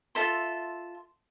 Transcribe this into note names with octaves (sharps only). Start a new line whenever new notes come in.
F4 A4 E5 C6